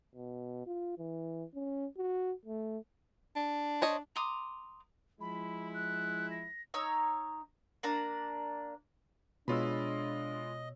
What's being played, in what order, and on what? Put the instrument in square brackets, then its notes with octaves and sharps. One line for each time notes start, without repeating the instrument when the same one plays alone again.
[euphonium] B2
F4
E3
C#4
F#4
A3
[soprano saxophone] D4
[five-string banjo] C5 C#5 D#5
[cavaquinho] A#5 C6 D6 D#6
[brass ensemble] F3 G#3 E4 [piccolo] B5
[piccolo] F#6
A#6
[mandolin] D#4 C#5 A#5 E6
A#3 D4 A#5
[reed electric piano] B2 C#5 E6 [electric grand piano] G#3 F4 B5 [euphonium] D4 [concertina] D#5